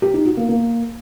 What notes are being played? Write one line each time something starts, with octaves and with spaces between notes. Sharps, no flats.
G4
D#4
F#4
A#3
A#3